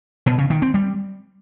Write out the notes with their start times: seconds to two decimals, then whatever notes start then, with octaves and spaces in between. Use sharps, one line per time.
0.26 B2
0.38 C#3
0.50 D#3
0.62 C4
0.74 G3